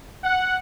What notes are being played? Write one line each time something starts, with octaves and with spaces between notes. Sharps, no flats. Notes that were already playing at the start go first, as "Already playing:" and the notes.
F#5